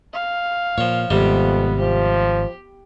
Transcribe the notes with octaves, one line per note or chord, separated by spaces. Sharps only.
F5
A#2 F3 C#5
G#1 F2 C3 G3 B3
F3 G4